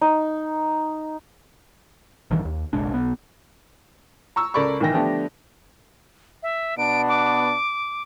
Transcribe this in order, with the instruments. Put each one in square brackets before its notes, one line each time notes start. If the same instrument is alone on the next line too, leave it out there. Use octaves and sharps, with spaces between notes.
[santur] D#4
[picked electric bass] A1 G2 D#3 E3
D#2
F#1 B1 G#3 D4
B1 B3
[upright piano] A#5 C#6 E6
C#2 A4 A#4 D5 B5 C#6
B1 D#3 E3 G5 A#6
D3 F3 A3 B3 D4 G4
[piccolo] E5
[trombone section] B2 B3 D4 [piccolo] D7
[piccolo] D6